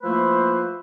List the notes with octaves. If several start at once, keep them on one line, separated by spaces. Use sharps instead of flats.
F3 A3 A#3 E4 B4 C5